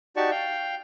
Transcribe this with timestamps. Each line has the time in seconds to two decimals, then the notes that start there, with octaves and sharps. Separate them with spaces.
0.16 D#4 F#4 G4 D5 A5 C#6
0.31 F5 G5